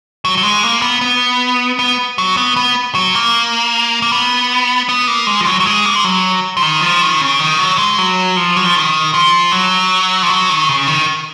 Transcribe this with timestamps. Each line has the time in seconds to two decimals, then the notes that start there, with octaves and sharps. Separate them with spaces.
0.25 F#3
0.37 F#3
0.43 G#3
0.63 A#3
0.82 B3
1.01 B3
1.79 B3
2.18 F#3
2.37 B3
2.56 B3
2.95 F#3
3.15 A#3
4.02 A#3
4.12 B3
4.89 B3
5.08 A#3
5.27 G#3
5.41 F3
5.46 F#3
5.60 F#3
5.66 G#3
5.85 A#3
5.96 G#3
6.04 F#3
6.57 F3
6.62 D#3
6.81 F3
7.02 D#3
7.21 C#3
7.39 D#3
7.58 F#3
7.78 G#3
7.98 F#3
8.37 F3
8.57 F#3
8.66 F3
8.75 D#3
9.14 F3
9.52 F#3
10.22 F3
10.29 F#3
10.49 D#3
10.69 C#3
10.87 D#3